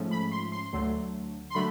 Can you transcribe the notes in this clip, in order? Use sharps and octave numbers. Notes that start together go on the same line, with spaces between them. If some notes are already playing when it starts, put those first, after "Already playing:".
Already playing: G#2 F3 A3 C#4
B5
C6
C6
D2 D3 F#3 A3
C6
D3 F#3 A3 B5